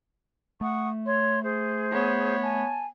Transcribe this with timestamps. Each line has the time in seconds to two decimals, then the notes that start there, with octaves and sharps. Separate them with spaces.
0.61 A3 F#5 C#6 D#6
1.05 C#5 C6
1.43 G#4 C5
1.91 B3 C#5
2.42 G#5 A5